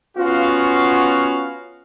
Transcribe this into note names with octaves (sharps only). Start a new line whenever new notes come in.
B3 C#4 F4 F#4 F5